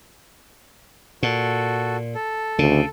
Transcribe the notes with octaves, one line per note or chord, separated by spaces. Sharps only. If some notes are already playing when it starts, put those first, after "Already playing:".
A#2 F#4 A4
A4
D2 C#3